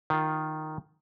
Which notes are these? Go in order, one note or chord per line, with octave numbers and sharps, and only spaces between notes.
D#3 F4